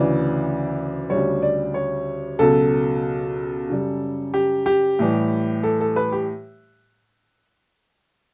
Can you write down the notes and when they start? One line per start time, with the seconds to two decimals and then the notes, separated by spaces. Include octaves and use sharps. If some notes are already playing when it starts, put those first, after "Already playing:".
Already playing: D2 C#3 E3 D5
1.10 D2 C#3 G3 C#5
1.42 D5
1.74 C#5
2.39 C#2 B2 F#3 A4
3.69 F#2 C#3 G3
4.34 G4
4.66 G4
4.99 A2 E3 G3
5.63 A4
5.81 A4
5.96 B4
6.12 G4